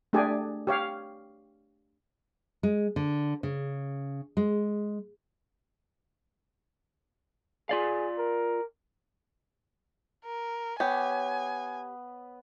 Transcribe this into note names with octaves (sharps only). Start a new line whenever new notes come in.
A3 D4 G4 G#4 D5 G#5
G4 C#5 F5
G#3
D3
C#3
G#3
F4 G#4 D5 F5
A#4
A#4
B3 G4 C#5 G#5